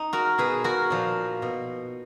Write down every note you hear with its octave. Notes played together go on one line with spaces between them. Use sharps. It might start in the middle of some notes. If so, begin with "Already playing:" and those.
Already playing: D#4
F#4 A#4
B2 G#4 B4
F#4 A#4
A#2 F3
B2